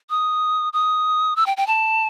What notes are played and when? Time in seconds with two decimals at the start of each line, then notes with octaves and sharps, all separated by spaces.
0.10 D#6
0.73 D#6
1.36 E6
1.46 G5
1.57 G5
1.67 A5